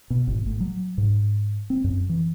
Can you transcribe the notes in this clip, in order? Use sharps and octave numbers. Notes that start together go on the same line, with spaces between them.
B2
G#1
A2
F#3
G#2
C4
F#2
E3